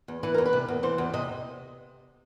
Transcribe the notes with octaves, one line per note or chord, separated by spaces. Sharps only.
E2
E3 B4
E2 A#4
B4
C3
E2
E3 C5
E2
C3 D#5